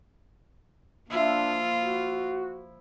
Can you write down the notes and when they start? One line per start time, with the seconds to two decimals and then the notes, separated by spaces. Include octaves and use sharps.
1.10 F3 A#3 D4 E4 F4 E5
1.81 F#4